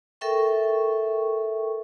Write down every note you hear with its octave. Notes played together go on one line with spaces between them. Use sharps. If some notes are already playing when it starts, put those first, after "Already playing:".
A4 A#4 E5 G5 C#6